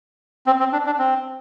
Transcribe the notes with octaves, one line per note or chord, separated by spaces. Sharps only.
C4
C4
D4
D4
C4